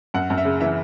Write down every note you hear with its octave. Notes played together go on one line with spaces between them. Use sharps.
F#2 F#5
F#2
E5
C#3
E3 E5